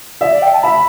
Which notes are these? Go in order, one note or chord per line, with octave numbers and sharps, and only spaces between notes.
D5 E5
D5
G5
A5
E5 B5